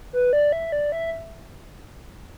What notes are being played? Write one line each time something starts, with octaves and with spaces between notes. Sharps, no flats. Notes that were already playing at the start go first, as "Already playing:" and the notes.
B4
D5
E5
D5
E5